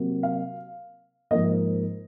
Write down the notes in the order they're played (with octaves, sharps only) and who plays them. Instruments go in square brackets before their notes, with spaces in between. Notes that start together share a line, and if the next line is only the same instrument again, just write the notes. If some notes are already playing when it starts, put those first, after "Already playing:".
Already playing: [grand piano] C3 F#3 A#3
F5
G#2 F3 A#3 D#5